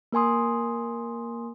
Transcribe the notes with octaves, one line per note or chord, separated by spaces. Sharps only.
A#3 A#4 G#5 C6 D#6